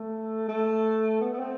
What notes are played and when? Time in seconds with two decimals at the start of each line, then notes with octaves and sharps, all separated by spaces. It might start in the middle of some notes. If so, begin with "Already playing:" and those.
Already playing: A3
0.48 A3
1.21 B3
1.34 B3
1.39 C4